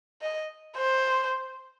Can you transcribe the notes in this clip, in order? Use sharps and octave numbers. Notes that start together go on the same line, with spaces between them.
D#5
C5